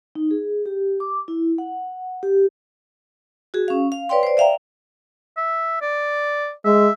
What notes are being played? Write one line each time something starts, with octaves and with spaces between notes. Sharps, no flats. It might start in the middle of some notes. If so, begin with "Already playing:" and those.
D#4
G#4
G4
D6
E4
F#5
G4
F#4 G#4
C#4 F5
F5
B4 C#5 D5 F5 G5 C6
C5 D5
D5 E5 F5 G5 A#5
E5
D5
G#3 E5